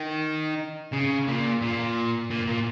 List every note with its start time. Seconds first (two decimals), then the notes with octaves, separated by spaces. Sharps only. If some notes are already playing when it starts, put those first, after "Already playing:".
Already playing: D#3
0.93 C#3
1.27 A#2
1.62 A#2
2.30 A#2
2.47 A#2